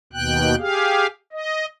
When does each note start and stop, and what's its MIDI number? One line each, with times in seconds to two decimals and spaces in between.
0.13 0.55 39
0.13 0.55 47
0.13 0.55 79
0.13 0.55 90
0.59 1.07 67
0.59 1.07 68
0.59 1.07 77
1.32 1.66 75